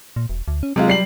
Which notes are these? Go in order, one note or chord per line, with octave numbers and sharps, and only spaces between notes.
A#2
E1
D2
C#4
C3 F#3 G#3 F4
G3 C7 F#7